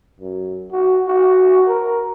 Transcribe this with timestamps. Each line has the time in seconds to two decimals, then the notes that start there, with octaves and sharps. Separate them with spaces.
0.20 F#2
0.72 F#4
1.08 F#4
1.67 A#4